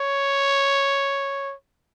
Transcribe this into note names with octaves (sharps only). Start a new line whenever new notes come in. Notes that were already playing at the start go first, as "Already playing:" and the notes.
Already playing: C#5